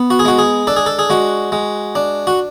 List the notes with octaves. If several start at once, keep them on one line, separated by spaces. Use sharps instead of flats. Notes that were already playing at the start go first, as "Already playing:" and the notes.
Already playing: B3
F#4
G#4
G#3 F#4
G#4
D4 A4
G#4
A4
G#4
G#3 F#4
G#3
D4
F#4